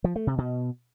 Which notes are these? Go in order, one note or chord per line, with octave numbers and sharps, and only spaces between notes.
F3
A3
C3
B2